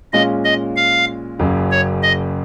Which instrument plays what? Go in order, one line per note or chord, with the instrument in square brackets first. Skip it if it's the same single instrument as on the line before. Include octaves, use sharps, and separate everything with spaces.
[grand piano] A#2 G#3 C#4 F4 [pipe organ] D#5
[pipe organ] D#5
F5
[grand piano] F#1 F#2 C#3
[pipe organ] C#5
D#5